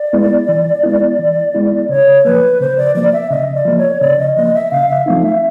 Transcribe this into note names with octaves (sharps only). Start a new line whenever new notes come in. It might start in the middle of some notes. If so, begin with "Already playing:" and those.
Already playing: D5
G#3 B3 E4
E3
G#3 B3 E4
E3
G#3 B3 E4
C#3 C#5
F3 A#3 B4
C#3 C5
D5
F3 A#3 D5
E5
C#3 D#5
D5
F3 A#3
C#5
C#3 D5
D#5
F3 A#3 D#5
E5
C#3 F5
E5
F3 A3 C4 D#4 F5
E5